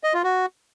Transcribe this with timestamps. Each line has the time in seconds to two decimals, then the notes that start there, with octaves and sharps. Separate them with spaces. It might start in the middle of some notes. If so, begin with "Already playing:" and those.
0.04 D#5
0.14 F4
0.24 F#4